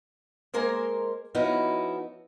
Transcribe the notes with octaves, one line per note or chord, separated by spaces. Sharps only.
G#3 A#3 A#4 C5 G#5
F3 B3 C#4 D#4 E4 F#4